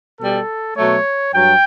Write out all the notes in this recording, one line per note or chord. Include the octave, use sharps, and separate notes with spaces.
B2 G3 A4
B2 F#3 A3 C#5
G2 F#3 G5